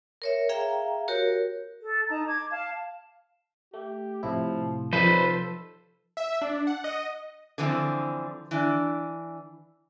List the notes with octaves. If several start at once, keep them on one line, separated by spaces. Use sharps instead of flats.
A#4 C#5 E5
G#4 E5 F5 G5 A#5
F#4 G4 A#4 C#5
A4
D#4 A5 A#5
D6 G#6
F5 A5
A3 G4
A2 C3 F3 E4
C3 F3 D#4 F4 A4 B4 C5
E5
D4
F#5
D#5
D3 E3 F3 C4
E3 D4